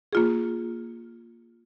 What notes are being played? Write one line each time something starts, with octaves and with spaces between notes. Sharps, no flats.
A#3 F4 G#4